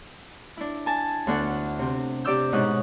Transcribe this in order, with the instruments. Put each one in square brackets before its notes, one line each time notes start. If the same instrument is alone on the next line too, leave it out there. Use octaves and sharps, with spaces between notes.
[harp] D4 E4
G#5 A5
D2 B3 D4 A4 F#5
C3 C4
C3 G4 D5 D6 E6 G6
G#2 B2 C#4 D#4 D#6 F#6